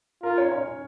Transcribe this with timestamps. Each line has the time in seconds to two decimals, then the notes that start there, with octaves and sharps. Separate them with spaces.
0.23 F4 A#4
0.38 C#4 C#5
0.51 C#4 C#5